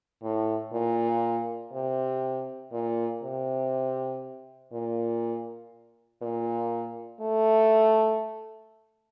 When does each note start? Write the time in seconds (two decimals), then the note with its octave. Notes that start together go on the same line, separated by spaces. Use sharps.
0.23 A2
0.73 A#2
1.73 C3
2.72 A#2
3.23 C3
4.72 A#2
6.22 A#2
7.21 A3